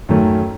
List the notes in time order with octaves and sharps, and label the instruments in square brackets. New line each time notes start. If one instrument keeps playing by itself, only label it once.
[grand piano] F#2 D#3 A3 C#4